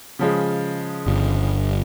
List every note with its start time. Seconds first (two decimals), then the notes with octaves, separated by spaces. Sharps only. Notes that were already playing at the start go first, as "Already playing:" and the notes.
0.19 C#3 F3 G#3
1.07 G1